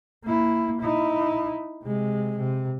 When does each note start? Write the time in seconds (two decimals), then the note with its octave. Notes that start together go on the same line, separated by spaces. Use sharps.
0.24 A#3 E4
0.80 D#4 E4
1.83 C3 G#3
2.37 C3